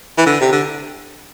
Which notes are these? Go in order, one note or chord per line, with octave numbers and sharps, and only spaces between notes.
E3
D3
C3
D3